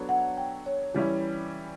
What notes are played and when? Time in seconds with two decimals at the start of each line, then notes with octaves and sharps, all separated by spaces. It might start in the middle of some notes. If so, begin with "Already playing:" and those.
Already playing: F#3 B3 D4 A4 C#5
0.09 F#5
0.37 G5
0.66 C#5
0.94 E3 G3 C#4 E4